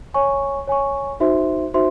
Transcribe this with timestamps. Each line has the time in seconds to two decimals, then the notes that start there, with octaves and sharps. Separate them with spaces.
0.14 C#5 G#5 C#6
0.67 C#5 G#5 C#6
1.20 D#4 F#4 C5 E5 C6
1.74 D#4 F#4 C5 E5 C6